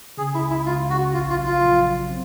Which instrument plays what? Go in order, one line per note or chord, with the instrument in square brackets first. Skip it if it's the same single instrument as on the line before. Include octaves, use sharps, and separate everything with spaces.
[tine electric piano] C#3 [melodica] G#4
[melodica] E4
[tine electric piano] C#2
[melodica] E4
[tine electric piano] C#2 [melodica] F4
[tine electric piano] C#3 [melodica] F#4
[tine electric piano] A#1 [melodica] F4
[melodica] F4
[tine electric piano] F#3
[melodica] F4
[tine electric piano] A#1
F#3
C4